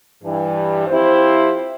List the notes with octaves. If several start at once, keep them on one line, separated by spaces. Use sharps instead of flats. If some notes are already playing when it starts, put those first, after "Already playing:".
G2 E3 G3
F3 C4 E4 G4 C5